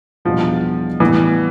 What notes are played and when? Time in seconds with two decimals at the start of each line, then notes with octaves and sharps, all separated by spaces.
0.25 E2 B2 F3 G3 B3 D4
1.00 A2 E3 G3 B3